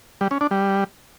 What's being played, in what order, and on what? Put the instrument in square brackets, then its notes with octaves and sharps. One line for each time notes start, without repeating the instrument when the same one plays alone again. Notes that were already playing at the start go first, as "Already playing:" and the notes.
[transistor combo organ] G3
C#4
D4
G3